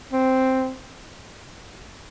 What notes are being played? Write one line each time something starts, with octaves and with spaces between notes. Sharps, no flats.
C4